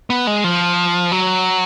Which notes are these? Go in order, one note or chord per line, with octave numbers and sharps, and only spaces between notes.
B3
G#3
F3
F#3